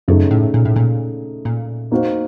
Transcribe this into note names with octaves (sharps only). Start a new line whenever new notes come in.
F#2 C#3 A3 D#4
A2
A#2
A2
A#2
A#2
A#3 D#4 F#4 C5 F5